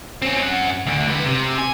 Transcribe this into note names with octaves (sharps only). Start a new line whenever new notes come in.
C4 C#4
F#2 F#5
D2 D3
G#2 B4
C3
G#5